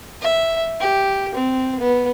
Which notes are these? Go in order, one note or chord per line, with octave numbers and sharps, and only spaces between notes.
E5
G4
C4
B3